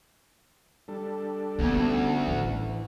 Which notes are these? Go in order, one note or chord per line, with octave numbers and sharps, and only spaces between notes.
G3 D4 A4
D2 B3 C#4
A1 E3